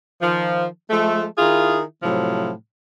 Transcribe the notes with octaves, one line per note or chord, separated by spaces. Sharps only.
D#3 F3
F3 G#3 A3
D#3 E4 F4 G#4
A2 C3 F3 F#3